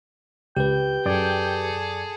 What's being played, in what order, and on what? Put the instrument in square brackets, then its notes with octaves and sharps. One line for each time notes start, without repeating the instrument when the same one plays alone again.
[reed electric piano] C#2 [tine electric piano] G4 B4 [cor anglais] G5
[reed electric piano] F#2 D5 D6 [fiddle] G#4 A4